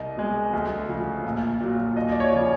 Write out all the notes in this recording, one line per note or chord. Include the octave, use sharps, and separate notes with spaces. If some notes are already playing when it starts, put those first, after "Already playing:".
Already playing: C2 D#5
B2 G#3
D2
C#3 F3
A#1
A#2 F#3
D#2 D#5
D5
C#5
C#3 F3